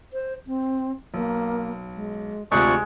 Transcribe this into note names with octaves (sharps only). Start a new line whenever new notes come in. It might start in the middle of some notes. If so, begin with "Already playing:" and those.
C5
C4
B1 A#3
G#3
D2 C3 G#3 F4 D5 C#6